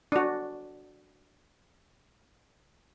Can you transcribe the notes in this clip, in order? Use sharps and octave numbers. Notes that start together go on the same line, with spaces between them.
D4 F#4